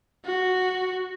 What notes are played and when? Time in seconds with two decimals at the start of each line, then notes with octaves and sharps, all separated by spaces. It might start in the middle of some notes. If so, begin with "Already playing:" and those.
0.25 F#4